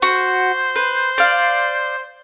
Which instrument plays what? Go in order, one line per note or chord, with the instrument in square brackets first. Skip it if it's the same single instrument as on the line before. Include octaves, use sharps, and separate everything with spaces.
[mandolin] F#4 [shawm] C5
[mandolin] B4
D5 F5